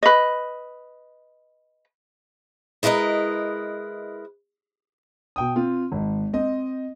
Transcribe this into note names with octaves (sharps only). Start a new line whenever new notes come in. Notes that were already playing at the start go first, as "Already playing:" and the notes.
B4 D#5
G#3 E4 A#4 B4 D#5
B2 G5 D#6
C4 F4
G#1
C4 D#5